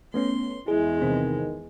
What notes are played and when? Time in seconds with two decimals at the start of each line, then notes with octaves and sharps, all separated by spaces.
0.14 A3 B3 C#4 C6
0.68 E2 G#3 E4 G#4
1.02 C3 D#3 E3 C4